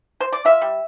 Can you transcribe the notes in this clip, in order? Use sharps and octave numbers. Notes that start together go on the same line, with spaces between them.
C5
D5
F4 E5
G3